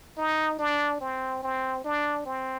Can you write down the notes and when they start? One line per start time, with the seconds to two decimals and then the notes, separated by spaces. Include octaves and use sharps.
0.17 D#4
0.59 D4
1.01 C4
1.43 C4
1.84 D4
2.26 C4